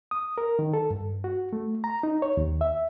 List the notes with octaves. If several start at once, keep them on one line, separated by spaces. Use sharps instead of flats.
D#6
A#4
D#3
A4
G2
F#4
A3
A#5
D#4
C#5
D#2
E5